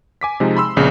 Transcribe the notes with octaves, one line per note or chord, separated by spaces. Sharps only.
G#5 D6 B6
C3 F3 G#3 D#4
B5 C6 E6
A#1 C#3 B3 C#4 G#4